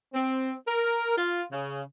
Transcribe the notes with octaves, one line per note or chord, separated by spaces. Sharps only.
C4
A#4
F4
C#3